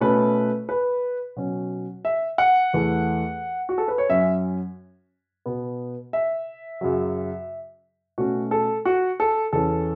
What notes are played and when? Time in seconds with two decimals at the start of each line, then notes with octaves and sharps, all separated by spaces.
0.01 B2 A3 C#4 B4
0.69 B4
1.36 B2 F#3 C#4
2.05 E5
2.38 F#5
2.74 E2 E3 A3
3.69 F#4
3.78 A4
3.88 B4
3.98 C#5
4.09 F#2 F#3 C#4 E5
5.46 B2 B3
6.13 E5
6.81 F#2 C#3 F#3
8.18 B2 A3 C#4 F#4
8.51 A4
8.85 F#4
9.20 A4
9.53 E2 E3 C#4 A4